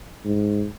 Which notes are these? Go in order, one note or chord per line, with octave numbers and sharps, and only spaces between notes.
G#2